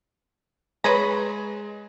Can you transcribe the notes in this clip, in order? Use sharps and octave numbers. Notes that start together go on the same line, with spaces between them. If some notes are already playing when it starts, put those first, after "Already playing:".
G#3 G#4 B4 C#5 A#5 G#6